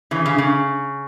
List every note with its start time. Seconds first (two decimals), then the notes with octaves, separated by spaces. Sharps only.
0.11 C#3 E3
0.26 C#3
0.38 C#3